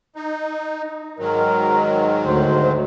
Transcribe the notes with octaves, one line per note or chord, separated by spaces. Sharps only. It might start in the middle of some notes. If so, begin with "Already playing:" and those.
D#4
G#2 D#3 F#3 A#4
D2 C5